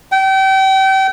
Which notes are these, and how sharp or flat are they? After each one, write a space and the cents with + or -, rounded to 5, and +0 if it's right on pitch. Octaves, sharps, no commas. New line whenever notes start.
G5 -35